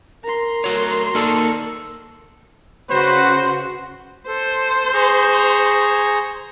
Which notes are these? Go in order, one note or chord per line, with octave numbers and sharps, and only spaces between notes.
A#4 A#5 C6
A3 F#4 C#5
A#3 D#4 A4 D5 C#6 F6
C#3 F#4 B4 C5
A4 C5
G#4 A#5 C#6